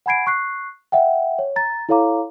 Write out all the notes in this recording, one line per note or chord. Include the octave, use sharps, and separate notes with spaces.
F#5 G#5 B5 G#6 C7 D7
C#6 F#6 C7
E5 F#5 G5
C#5
A#5 A6
E4 A4 C#5 F5 A#5 D6